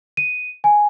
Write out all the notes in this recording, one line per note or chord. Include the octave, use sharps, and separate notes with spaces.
D#7
G#5